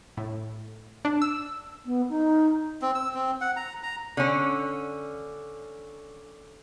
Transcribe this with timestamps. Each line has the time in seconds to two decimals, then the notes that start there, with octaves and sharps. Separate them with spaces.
0.17 A2
1.05 D4
1.22 E6
1.86 B3
2.09 D#4
2.82 C4
2.95 E6
3.14 C4
3.41 F#5
3.56 A#5
3.83 A#5
4.17 D3 C#4